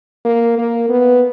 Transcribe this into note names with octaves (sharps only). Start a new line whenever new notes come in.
A#3
A#3
B3